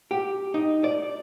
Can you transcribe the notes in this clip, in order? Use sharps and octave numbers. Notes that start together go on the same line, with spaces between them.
G4
D#4
D5